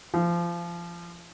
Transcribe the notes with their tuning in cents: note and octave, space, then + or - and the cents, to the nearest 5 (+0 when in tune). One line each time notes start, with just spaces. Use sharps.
F3 -25